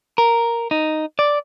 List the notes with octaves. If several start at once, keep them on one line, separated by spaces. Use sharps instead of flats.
A#4
D#4
D5